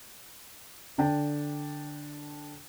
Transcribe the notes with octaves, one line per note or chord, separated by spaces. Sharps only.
D3 D4 G5